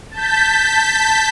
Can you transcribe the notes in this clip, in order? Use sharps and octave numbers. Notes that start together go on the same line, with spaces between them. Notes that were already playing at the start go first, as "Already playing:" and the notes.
A5 G6 B6